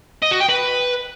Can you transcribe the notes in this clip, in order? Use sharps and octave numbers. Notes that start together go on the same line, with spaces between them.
D#5
F#4
G5
B4